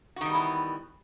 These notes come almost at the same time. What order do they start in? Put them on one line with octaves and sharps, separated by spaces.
F#4 D#3 G3 B3 E3